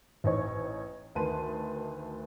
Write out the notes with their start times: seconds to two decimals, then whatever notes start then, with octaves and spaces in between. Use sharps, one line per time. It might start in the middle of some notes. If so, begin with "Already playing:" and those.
0.24 A1 D#4 C#5 C#6
1.15 D2 D#3 B4 A5 C6 D#7